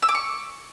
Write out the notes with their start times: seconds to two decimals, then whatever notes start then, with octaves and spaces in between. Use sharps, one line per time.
0.02 E6
0.09 D6
0.15 C#6